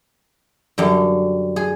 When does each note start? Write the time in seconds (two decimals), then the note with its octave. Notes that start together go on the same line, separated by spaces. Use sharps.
0.78 F#2 D3 G3
1.56 G#4